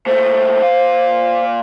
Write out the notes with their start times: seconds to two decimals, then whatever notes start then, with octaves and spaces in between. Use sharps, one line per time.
0.06 A#2 A3 C5
0.61 A#2 F5